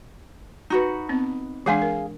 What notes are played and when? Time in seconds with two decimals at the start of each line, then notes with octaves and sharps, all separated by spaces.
0.70 D#4 F#4 B4
1.09 B3 C4
1.66 E3 G#3 D4 G#4 F5 G#5
1.82 A#4